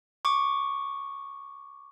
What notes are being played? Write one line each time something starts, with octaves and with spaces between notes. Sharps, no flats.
C#6 D6